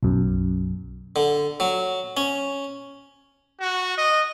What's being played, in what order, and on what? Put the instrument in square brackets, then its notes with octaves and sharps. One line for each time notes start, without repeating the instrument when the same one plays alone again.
[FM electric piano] B1 F#2
[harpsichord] D3
F#3
C#4
[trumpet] F#4
D#5